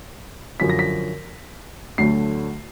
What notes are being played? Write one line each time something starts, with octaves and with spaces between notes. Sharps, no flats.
F#2 D3 F3 B6
A#6
B6
D2 D3 F#3 A3 C7